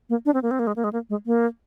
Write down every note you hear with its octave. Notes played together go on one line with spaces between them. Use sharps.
A#3
D4
C4
A#3
C4
A#3
G#3
A#3
G#3
A#3
G#3
A#3